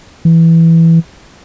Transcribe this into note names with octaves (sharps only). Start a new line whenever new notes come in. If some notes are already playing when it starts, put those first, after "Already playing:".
E3